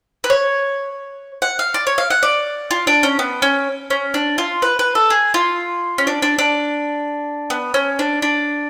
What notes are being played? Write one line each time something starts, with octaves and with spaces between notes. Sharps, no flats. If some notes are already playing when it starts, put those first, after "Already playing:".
B4
C#5
F#5
F5
D5
C#5
F5
F#5
D5
F4
D4
C#4
B3
C#4
C#4
D4
F4
B4
B4
A4
G#4
F4
C#4
D4
D4
D4
B3
C#4
D4
D4